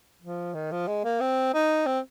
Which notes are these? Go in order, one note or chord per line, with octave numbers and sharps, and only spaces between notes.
F3
D#3
F3
G#3
A#3
C4
D#4
C4